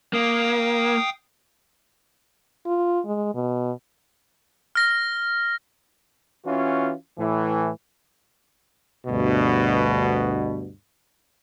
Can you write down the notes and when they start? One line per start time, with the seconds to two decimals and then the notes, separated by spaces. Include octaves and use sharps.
0.13 A#3 F5 G5 D#6
2.66 F4
3.06 G#3
3.35 B2
4.75 F6 A#6
6.46 E3 C#4 F4 F#4
7.18 A2 E3
9.06 D2 G2 B2